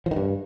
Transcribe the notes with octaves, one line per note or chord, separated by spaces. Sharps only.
F3
D#3
G2